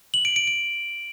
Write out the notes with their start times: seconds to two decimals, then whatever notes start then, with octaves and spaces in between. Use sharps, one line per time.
0.14 F#7
0.25 D7
0.36 D7
0.47 D7